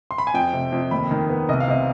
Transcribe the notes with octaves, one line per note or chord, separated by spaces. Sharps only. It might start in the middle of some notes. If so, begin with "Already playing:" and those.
C6
B5
G#5
F2 G5
C3
F2
D#2 B5
D#3
B3
C2 D#5
F5
C3 D#5